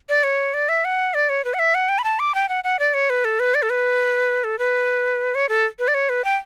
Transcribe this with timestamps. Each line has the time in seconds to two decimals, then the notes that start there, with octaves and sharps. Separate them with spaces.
0.09 D5
0.23 C#5
0.54 D5
0.69 E5
0.85 F#5
1.14 D5
1.29 C#5
1.45 B4
1.54 F#5
1.59 E5
1.75 F#5
1.89 G5
1.99 B5
2.04 A5
2.19 D6
2.35 G5
2.49 F#5
2.64 F#5
2.79 D5
2.94 C#5
3.10 B4
3.25 A4
3.40 B4
3.55 D5
3.62 A4
3.70 B4
4.44 A4
4.59 B4
5.35 C#5
5.49 A4
5.79 B4
5.88 D5
5.94 C#5
6.09 B4
6.24 G5